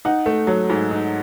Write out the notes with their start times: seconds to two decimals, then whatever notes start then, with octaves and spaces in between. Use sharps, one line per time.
0.05 D#4 F#5
0.26 A3
0.47 F#3
0.70 G#2
0.91 D#4